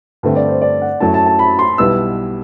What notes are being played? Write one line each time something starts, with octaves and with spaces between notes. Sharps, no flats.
G2 D3 A3 C4
D5
C5
D5
F#5
F#2 F#3 A3 E4 A5
A5
A5
B5
C6
B1 B2 G3 B3 E4 E6